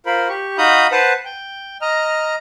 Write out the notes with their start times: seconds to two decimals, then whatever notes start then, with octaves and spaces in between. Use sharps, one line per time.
0.06 F4 A#4 C5 B5
0.29 G4 C#6
0.58 D#4 F#4 F5 B5 D#6 G6
0.92 B4 C5 F#5 A5
1.25 G5
1.81 D#5 A#5 F6